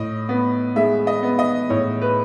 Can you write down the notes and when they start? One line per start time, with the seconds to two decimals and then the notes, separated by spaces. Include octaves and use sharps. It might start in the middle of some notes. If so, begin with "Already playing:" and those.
Already playing: A2 D#5
0.29 B3
0.76 G#3 E5
1.07 D#5
1.23 B3
1.39 D#5
1.70 A2 C#5
2.01 B4